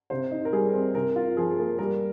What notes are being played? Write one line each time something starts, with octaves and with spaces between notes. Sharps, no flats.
C3 C5
D#4
A#4
G3 G#4
C4
C3 A#4
F4
F3 G#4
A#3
G3 A#4